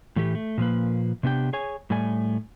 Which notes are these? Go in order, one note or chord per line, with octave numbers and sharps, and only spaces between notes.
A2 E3 A3 G4
A3
A#2 F3 A#3 B4
C3 B3 D4 G4 G5
G#4 C#5 G#5
A2 G3 A3 D5 G#5